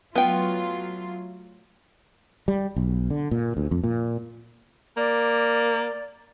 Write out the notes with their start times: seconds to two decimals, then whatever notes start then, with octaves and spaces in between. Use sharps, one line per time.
0.15 F#3 A3 B3 F4 G5
2.48 G3
2.76 B1
3.10 D3
3.31 A#2
3.57 D2
3.71 F2
3.84 A#2
4.97 A#3 D5